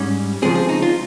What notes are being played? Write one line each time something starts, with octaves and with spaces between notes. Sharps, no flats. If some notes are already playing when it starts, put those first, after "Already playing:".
Already playing: G#2 G3 C#4
C#3 F3 G#3 C4 G#4
G#4
D#4
F4